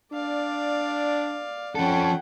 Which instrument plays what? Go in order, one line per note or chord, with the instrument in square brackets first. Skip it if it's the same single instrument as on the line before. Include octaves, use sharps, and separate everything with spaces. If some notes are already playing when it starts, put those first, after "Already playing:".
[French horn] D4 [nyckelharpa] D5 F5
[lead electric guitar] F3 A4 [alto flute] C#4 [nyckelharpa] F#5 G5